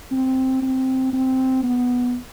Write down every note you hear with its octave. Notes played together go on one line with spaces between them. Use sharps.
C4
C4
C4
B3